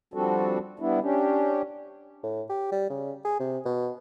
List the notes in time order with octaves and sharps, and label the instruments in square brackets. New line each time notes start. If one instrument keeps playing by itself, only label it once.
[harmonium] F3 G3 C4 D4 F#4 A4
G3 B3 D4 E4
C#4 D4 G4
[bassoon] A2
G4
G3
C#3
G#4
C3
B2